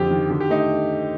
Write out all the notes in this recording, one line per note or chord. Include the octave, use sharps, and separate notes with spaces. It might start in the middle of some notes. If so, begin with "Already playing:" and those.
Already playing: F2 D3 G4
D#3
D3 G4
G4
A3 D#4